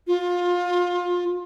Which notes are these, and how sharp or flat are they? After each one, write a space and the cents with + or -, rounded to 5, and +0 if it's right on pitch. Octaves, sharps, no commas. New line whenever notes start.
F4 +25